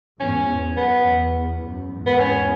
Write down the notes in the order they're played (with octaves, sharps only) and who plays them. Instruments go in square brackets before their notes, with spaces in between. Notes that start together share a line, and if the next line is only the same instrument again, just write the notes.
[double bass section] E2 G#2 [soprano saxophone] C#4
[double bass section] E2
[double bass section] F#2 [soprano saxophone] B3
[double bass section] E2
F#2
E2 G#2
[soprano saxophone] B3
C#4